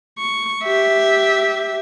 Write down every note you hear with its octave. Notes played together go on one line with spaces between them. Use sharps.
C#6
G4 E5